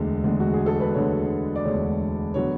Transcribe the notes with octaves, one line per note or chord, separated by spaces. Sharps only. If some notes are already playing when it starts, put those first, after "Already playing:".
Already playing: E1 D2 D3 G#3
E1 D2 D3 G#3
F#4
G#4
A4
B4
E1 D2 D3 G#3 C#5
D5
E1 D2 D3 G#3 C#5
D3 F#3 B3 C#5